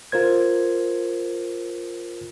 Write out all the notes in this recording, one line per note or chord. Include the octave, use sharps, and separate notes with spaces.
F4 A#4 C5 G#6